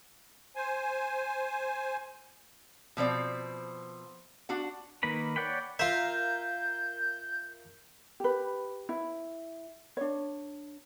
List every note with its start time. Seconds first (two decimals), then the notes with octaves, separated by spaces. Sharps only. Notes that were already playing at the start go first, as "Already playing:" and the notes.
0.56 C5 G#5
2.97 B2 F3 C4 D5
4.49 D4 F#4 F#5
5.03 D#3 A#3 A#4 B4 B5
5.36 C#5 D5 F#5 G5 B5
5.79 F4 A#4 E5 F5 G6
8.20 G4 B4
8.89 E4
9.97 D4 C#5